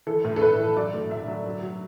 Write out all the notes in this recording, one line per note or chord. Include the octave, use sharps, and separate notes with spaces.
E3 A4
A2
A4
A2 B4
E3
F#3 D5
A2
A2 E5
F#3
F#3
F#3